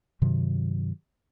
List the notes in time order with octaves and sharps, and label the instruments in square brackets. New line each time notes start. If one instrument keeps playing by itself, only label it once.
[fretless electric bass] G2 C3 D#3 F#3